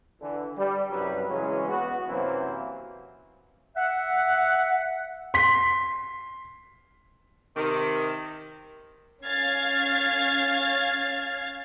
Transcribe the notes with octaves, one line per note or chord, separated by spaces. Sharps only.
D3 E3
G3
C2 F#2 F#3 G3 B4
C#3 E3 F#3 G#3 C#4
B3 F#4
F#2 C3 E3 F#3 A#3 C5
E5 F#5
C6 B6
C3 D#3
C#4 F5 F6 G#6 A6 C7